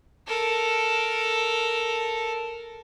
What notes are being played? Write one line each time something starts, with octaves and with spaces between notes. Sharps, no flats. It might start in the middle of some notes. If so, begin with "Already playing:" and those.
A4 A#4